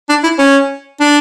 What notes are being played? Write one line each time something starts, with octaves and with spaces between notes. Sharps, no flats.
D4
E4
C#4
D4